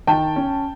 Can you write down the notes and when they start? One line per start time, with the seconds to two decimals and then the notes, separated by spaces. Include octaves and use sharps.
0.07 D#3 G5 A5
0.36 C#4